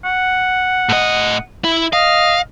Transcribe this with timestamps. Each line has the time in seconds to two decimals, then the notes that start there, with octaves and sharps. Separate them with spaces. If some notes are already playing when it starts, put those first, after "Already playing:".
0.05 F#5
0.89 A2 D#5
1.64 E4
1.93 D#5 F5